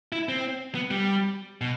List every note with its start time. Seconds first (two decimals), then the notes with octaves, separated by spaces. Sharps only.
0.12 E4
0.29 C4
0.75 B3
0.91 G3
1.61 B2